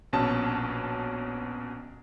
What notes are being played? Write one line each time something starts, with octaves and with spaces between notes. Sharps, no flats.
A#1 B2 C#4 A5